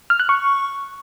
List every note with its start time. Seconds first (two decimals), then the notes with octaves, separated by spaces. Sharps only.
0.10 F6
0.20 F#6
0.29 C#6